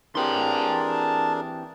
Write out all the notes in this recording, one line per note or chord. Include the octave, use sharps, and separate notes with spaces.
E3 C4 D4 G4 G#4 A#4 A5 C6